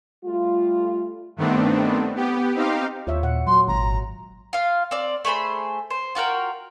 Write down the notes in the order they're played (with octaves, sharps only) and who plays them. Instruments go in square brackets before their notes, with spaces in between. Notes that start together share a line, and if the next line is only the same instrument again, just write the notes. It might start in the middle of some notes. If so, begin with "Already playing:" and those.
[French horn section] G3 A3 F4
[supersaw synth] G2 D#3 A3 B3 C4 D4
B3 G4
C4 D#4 G4 F5
[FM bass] D#2 [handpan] F4 C#5 E5
[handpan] A#2 F#5
[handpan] F#3 [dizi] C6
[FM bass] G#1 [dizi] A#5
[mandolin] F4 F5
C4 D5
A3 G#4 C5 B5
C5
F4 F#4 A#4 G5